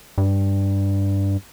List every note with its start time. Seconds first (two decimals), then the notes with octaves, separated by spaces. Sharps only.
0.18 G2